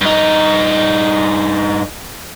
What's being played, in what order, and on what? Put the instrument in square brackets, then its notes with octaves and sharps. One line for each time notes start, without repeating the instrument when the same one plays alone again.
[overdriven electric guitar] G2 D#4